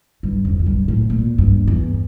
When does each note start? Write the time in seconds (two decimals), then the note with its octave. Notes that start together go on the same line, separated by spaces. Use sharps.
0.23 G2
0.45 F2
0.59 F2
0.66 G2
0.88 A2
1.10 A#2
1.38 G2
1.67 E2